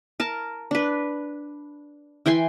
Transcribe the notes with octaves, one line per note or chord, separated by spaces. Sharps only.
A#4 A5
D4 B4
E3 G5 G#5 C6